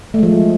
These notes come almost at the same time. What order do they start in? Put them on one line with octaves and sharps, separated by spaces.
A3 G#3 F3